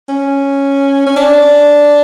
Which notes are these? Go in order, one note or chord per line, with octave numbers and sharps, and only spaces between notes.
C#4
C#4
D4